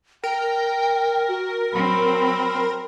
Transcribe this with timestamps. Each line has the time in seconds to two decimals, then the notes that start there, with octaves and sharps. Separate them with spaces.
0.24 A#4 G5
1.29 F#4
1.73 F#3 C4 B5